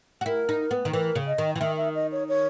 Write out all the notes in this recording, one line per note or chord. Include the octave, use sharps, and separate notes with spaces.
F#4
E4 A#4
D#4
B3
D#3
E3 A#4
C#3
D#5
D#3
E3
D#3 E5
E5
D#5
C#5
C#5